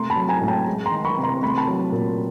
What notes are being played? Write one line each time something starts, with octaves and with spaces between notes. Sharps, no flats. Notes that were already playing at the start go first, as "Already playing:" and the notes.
Already playing: C3 A3 A#5 C6
A5 B5
F#3
G#5 A#5
A2
G5 A5
G#3
A#5 C6
D#3
B5 C#6
C3
A#5 C6
A3 B5
C6
A5 B5
F#3
A#2